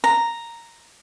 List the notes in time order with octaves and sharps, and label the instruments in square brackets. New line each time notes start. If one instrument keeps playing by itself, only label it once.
[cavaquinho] A#5